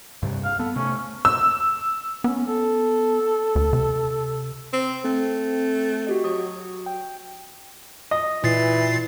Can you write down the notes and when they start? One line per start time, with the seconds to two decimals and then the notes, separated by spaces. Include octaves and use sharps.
0.23 G2 C3 G3
0.44 F5
0.60 B3 A4
0.76 C3 A3 C#4
1.25 E6
2.24 B3 C#4
2.47 A4
3.56 D2
3.73 C3
4.73 C4
5.05 A3 C4
6.07 F#4 G4 D#5
6.24 F#3 D#6
6.86 G5
8.11 D#5
8.44 A#2 E3 A6 C7